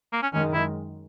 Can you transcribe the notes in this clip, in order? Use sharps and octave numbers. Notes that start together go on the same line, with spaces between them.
A#3
C#4
F#2 D#3 G#3 C#4
E4